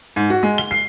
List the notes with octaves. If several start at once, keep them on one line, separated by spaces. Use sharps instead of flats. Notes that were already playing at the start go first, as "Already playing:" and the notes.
G#2
F#4
G#3
G7
C7